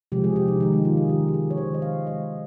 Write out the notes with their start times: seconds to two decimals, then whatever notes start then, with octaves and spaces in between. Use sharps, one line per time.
0.12 C3 F3 G#3 G4
0.24 G#4
0.36 G4
0.48 D#4
0.60 D#3 G#3 D#4
0.73 D#4
0.85 F4
0.97 G#4
1.09 D#3 G#3 G4
1.28 G4
1.34 G#4
1.50 C#5
1.58 D#3 G#3 C5
1.74 D#5
1.82 F5
2.07 D#3 G#3 D#5